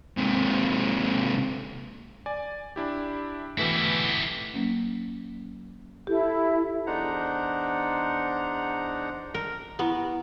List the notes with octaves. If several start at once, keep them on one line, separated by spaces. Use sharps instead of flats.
G#2 C3
D5 G#5
D4 E4 G4
B2 E3 A3 E4 G4
F#3 A#3 C#4
E4 G4 A4
E2 D4 D#4 C5 F#5 A#5
A#4
B3 E4 G4